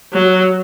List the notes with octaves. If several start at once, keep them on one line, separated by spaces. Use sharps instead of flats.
F#3